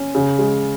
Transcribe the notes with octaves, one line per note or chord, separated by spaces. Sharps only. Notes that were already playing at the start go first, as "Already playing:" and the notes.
Already playing: C#4
C#3
G#3